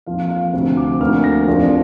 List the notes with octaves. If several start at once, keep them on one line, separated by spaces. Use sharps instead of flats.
F2 F3 A#3 F4 F5
F5
D2 C3 F3 C4
D6
D2 D3 F3 A#3 D4 F6
A#6
F1 F2 F3 D4 F4